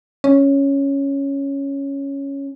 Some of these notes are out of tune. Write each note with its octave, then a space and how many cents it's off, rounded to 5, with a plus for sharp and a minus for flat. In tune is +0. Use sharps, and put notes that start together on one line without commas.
C#4 +0